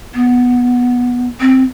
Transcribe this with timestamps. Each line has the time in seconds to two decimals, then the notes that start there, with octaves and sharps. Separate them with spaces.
0.14 B3
1.40 C4